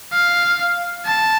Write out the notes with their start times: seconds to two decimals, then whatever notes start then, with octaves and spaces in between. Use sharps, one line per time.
0.13 F5
1.06 A5